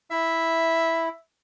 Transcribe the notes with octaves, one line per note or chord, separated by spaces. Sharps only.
E4 E5